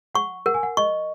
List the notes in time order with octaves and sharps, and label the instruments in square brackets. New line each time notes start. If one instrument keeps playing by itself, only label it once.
[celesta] F#5 [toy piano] C#6
[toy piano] A#4 [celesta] F#5
[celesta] G#5
F#5
[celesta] D#5 [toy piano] C#6